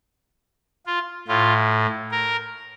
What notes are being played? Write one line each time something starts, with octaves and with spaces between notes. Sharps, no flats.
F4
A2 F4
A#4